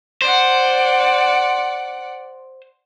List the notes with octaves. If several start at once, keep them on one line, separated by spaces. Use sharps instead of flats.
C5 D5 F#5